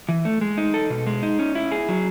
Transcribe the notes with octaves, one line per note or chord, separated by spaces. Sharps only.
E3
A3
G#3
D#4
A4
B2
G#3
D#4
C#4
E4
G#4
F#3